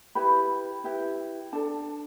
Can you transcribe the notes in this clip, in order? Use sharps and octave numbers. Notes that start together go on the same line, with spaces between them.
E4 G4 B4 B5
E4 G4 B4
D4 A4 A5